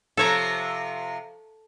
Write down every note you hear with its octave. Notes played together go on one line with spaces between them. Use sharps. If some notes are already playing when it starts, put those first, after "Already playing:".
C3 F3 A4 C#5 A#5